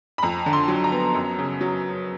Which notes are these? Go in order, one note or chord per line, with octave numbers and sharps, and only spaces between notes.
B5
F2 A#5
D3
C6
F#3
A#5
B3
F#2
C#3
F#3